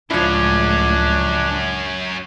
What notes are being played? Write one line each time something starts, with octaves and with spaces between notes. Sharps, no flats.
C#2 F#2 A2 F3 C#4 D4 E4